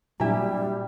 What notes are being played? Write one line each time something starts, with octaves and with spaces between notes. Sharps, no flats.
A#2 F#3 G3 D4 E4 G4 E5